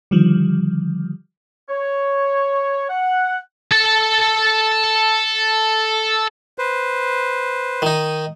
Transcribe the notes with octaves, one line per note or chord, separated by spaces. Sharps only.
D3 D#3 F3 G3
C#5
F#5
A4 A5
B4 C5
D#3 D#4